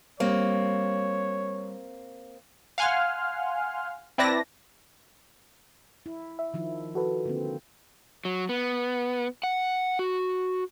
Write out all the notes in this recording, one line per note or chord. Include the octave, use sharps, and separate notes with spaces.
G3 A#3 C4 C#5
F5 F#5 G#5 C6 F6
C4 E4 B4 D5 A5 A#6
E4
E5
D#3 F3 E4
F#4 A4 B4
D3 A#3 C4
F#3
B3
F#5
F#4